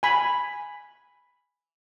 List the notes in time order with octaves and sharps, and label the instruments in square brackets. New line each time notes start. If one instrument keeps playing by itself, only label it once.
[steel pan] G#5 B5